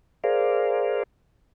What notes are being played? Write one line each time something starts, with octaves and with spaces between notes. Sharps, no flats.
G#4 A#4 C5 D5 F5